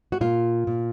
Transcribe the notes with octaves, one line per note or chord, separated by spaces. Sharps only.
F#4
A#2 F4
A#2